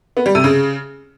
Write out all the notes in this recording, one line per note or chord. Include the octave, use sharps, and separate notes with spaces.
B3
G3
C3
C#3